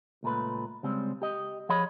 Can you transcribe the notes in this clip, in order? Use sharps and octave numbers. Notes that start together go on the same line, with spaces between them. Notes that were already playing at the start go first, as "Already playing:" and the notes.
C#2 A#2 A3 B4
C#3 G3 G#3 C4
G4 D#5
F3 G#4 C#5 D#5 B5